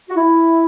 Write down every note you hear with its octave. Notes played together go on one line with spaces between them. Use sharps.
F#4
E4